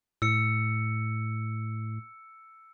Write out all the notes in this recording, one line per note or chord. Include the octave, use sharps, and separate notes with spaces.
A2 E6 C#7